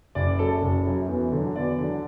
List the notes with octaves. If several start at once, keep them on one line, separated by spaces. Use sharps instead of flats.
F#1 D5
F#2 F#3 A4
F#1
F#2 F#3
E2
D3 F#3
E2 D5
D3 F#3